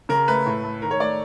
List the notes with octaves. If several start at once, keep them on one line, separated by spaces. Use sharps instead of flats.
C#3 A#4
A3 B4
A2
A3
D#3 A#4
C#5
A3 D5